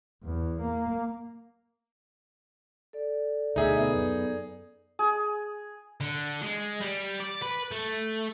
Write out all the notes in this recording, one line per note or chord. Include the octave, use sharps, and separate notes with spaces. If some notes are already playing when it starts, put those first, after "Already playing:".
E2
A#3
A4 D5
D2 B2 D#4 G#4 E5
B3
F#2
G#4
D3
G#3
G3
D5
B4
A3